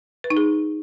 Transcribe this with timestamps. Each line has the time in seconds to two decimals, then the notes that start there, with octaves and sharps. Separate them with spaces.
0.24 B4
0.30 D#4
0.37 G#4